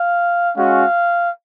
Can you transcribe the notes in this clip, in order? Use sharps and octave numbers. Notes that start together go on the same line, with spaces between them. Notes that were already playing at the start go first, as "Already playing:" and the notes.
Already playing: F5
G#3 C#4 F#4 F5